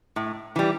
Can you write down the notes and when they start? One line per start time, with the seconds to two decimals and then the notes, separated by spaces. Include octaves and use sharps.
0.16 A2
0.56 E3 G3